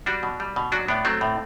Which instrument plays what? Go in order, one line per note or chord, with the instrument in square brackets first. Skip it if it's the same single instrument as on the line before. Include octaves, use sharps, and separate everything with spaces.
[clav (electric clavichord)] G3 D4 F#4
B2
G3
B2
F#3 D4 F#4
A2 B3 D4
F#3 A3 C4
A2